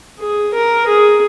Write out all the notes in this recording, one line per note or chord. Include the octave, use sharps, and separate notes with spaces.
G#4
A#4
G#4